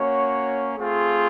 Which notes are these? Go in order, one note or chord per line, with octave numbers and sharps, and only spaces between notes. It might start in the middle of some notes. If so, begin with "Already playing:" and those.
Already playing: A#3 C#4 F#4 C#5
A3 C4 F4 G#4